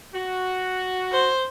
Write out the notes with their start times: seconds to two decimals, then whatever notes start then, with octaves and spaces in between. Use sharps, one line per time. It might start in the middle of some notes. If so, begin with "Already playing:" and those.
0.14 F#4
1.13 C5